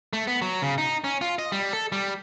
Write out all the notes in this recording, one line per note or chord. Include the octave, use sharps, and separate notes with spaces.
A3
B3
F#3
C#3
D#4
C#4
F4
D#5
G3
A4
G3